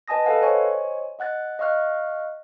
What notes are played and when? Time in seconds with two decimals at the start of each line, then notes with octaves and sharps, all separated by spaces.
0.08 B4 D#5 G#5 A5 D#6 A#6
0.25 A4 B4 D#5 F5 F#5 G#5
0.42 C5 C#5 D#5 G#5 C#6
1.19 D#5 F#5 F#6 A6
1.59 D#5 F5 C#6 F6 F#6